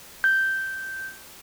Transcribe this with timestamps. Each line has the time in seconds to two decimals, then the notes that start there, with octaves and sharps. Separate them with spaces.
0.24 G6